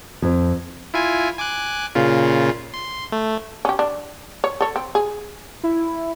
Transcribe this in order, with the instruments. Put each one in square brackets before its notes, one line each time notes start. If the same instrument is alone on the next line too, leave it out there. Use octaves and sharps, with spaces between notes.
[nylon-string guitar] F2
[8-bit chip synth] E4 F4 G#5
G#5 D6 F#6
A#2 C#3 F4
C6
A3
[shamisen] C#4 G4
D4
C#5
A4 C#5
C4
G#4
[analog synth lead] E4